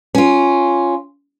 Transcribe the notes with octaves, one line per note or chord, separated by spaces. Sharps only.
C#4 F4